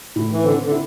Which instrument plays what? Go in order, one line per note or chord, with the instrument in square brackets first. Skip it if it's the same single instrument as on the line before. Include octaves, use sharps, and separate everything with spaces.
[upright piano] A2
[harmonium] E3
[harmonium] D3 [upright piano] C4
[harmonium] D3
[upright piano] E4